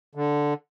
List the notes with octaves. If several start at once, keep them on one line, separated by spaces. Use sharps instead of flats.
D3